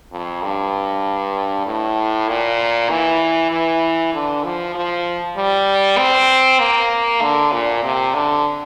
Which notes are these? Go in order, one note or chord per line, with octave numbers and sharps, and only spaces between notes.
F2
G2
A2
A#2
E3
E3
D3
F3
F3
G3
C4
A#3
D3
A#2
C3
D3